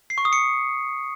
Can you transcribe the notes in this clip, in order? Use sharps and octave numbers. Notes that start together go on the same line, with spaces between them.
C7
C#6
D#6
C#7